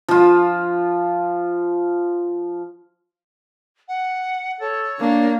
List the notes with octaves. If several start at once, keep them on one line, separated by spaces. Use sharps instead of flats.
F3 F4
F#5
A4 C#5
A#3 D4